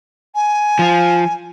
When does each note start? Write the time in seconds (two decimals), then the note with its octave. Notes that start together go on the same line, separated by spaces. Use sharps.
0.35 G#5
0.79 F3 F4